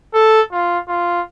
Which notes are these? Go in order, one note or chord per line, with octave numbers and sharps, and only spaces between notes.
A4
F4
F4